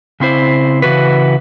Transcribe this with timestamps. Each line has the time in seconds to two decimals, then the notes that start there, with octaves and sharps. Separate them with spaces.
0.20 C#3 C4 E4 C5
0.82 C#3 E3 F#4 B4